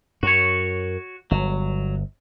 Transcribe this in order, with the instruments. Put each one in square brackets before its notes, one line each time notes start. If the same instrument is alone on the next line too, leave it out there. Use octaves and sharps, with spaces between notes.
[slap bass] F#2 [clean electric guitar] F#4 C#5
[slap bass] G1 [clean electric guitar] F#3